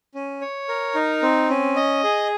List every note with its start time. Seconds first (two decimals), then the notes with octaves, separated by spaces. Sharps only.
0.14 C#4
0.41 C#5
0.69 A#4
0.95 D#4
1.22 C4
1.50 C#4
1.76 D#5
2.04 G#4